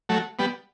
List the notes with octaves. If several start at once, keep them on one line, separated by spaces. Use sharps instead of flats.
F#3 A3
G3 B3